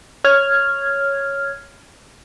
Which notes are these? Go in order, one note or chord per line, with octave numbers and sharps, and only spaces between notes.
C#5 F6 G#6